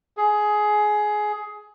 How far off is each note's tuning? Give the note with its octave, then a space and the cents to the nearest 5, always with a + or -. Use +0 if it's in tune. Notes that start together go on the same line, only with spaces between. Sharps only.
G#4 +15